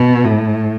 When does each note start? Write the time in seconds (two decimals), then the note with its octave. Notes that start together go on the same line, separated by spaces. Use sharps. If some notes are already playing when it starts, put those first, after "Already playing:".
Already playing: B2
0.24 A2